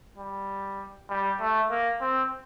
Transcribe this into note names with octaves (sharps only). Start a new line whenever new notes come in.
G3
G3
A3
A#3
C4